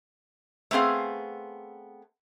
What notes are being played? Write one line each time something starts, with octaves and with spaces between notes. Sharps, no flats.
A3 B3 C4 G#4 F5